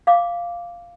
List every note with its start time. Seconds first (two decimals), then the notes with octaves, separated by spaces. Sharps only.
0.07 F5 D6